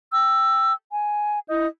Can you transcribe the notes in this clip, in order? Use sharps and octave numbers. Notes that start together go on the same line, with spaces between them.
G5 E6
G#5
E4 D#5 D#6 G6